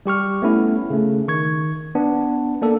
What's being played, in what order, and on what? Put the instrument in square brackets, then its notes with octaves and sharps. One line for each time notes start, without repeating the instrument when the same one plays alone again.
[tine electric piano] G3 G4 C#6 F6
A3 B3 C#4 E4
C#3 A3
D#3 C#6 G#6
B3 D4
A#3 D4 A4